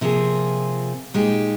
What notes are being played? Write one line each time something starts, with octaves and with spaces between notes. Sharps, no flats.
C3 F3 A#3 F4 G#4
A#2 G#3 D#4 G4